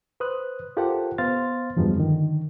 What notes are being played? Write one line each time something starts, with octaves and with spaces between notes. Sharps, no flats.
B4 C5 D#6 F#6
F4 G4 A4 A#4 C5 F#5
B3 C5 F5 C6 F6 A6
E2 G2 F3 F#3 G#3 B3
D3 D#3